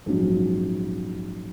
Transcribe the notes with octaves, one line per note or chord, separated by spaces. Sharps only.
A#1 G#2 F#3 C#4